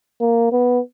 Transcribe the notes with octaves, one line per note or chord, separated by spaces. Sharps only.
A#3
B3